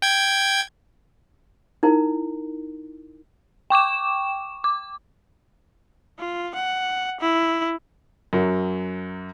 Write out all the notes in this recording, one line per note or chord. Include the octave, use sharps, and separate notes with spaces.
G5 G#6
D#4 E4 A#4
G5 C#6 D6 E7
D6
F4
F#5
E4
F#2 F#3